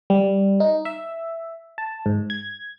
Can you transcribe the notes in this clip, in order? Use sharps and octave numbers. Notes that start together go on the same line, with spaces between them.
G3
D#4
E5
A5
G#2
G#6